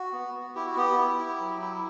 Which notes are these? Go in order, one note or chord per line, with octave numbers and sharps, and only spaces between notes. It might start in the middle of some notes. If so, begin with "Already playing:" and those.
Already playing: F#4
B3
B3
E4 G4
F#4
B3 G4
E4
E4
F#3
E4